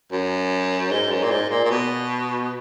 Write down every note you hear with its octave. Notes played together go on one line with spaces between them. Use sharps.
F#2
G#2
F#2
A#2
G#2
A#2
A#2
B2